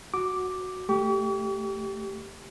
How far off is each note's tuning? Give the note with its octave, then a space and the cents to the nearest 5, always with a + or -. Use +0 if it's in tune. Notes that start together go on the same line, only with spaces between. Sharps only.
F#4 +0 D6 +0
A3 +0 G4 +0 C#6 +45